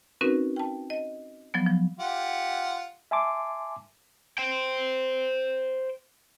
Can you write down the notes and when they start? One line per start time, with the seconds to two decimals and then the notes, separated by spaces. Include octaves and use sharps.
0.21 C4 C#4 D#4 F#4 A#4 B4
0.56 G5 A5
0.90 D#5
1.54 F3 F#3 B3
1.66 F3
2.00 F4 G4 F#5
3.11 E5 G#5 A5 C6 D6
4.38 C5 G5